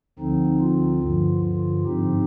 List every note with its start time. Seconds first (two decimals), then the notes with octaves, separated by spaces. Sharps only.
0.19 D2 D3 F3 C4 D#4
0.61 F4
1.02 G2 D3 F3
1.44 F4
1.85 G#2 F3 C4 D#4 G4